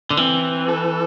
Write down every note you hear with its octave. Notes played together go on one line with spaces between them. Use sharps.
D3
E3 C4
A4